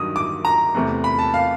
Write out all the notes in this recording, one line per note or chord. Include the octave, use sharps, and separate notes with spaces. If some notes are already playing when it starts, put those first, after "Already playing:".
Already playing: G2 D#3 F#3 D#6
D6
A#5
E2 C3 E3 A3
B5
A5
F5